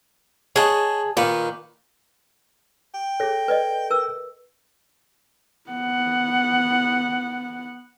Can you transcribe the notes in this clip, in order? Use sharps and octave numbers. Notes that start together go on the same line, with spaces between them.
G#4 C#5 D#5 F#5 A5
A#2 D#3 B4 F5
G5
G#4 A4 C#5 A#6
B4 D5 D#5
A#4 B4 E6
B3 F#5